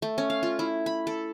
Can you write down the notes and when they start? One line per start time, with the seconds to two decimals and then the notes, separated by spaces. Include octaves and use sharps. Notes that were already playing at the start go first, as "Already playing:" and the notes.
0.02 A3
0.18 C#4
0.30 F5
0.43 F4
0.59 E4
0.86 B5
1.07 A4